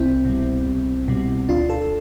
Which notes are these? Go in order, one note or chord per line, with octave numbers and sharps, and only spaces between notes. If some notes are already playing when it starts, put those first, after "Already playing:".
Already playing: C2 C4 E4
B2 G3
C2
B2 G3
D2 D4 F4
F4 A4